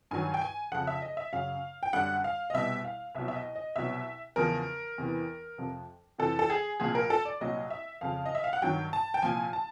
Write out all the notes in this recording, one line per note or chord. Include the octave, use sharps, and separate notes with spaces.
G2 D#3 F#3 G#5
G5
G#5
F2 C#3 F3 F#5
E5
D#5
E5
F#2 C#3 F#3 F5
G5
F#2 D3 G3 F#5
F5
D#5
C2 B2 G3 E5
F5
C2 B2 F#3 E5
E5
D#5
D#5
C2 B2 F#3 E5
E2 C#3 F3 A#4
E2 C3 E3
F2 C3 F3
F2 C3 E3 A4
A4
G#4
C2 A#2 F3 G#4
A#4
A4
D5
C2 A#2 F#3 D#5
E5
F2 C#3 F3 F5
D#5
E5
F5
F#5
G2 D#3 F#3 G5
A5
G5
C2 A#2 F3 G#5
A5